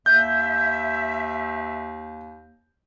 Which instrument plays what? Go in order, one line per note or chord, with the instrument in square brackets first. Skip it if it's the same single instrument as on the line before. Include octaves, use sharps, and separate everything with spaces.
[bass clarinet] D#2 [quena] E5 [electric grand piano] G6